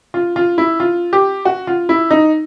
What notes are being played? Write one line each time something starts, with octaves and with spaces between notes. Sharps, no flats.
F4
F4
E4
F4
G4
F#4
F4
E4
D#4